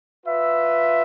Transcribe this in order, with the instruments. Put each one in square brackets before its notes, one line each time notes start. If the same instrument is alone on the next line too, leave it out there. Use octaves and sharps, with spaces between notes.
[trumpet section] F4 B4 E5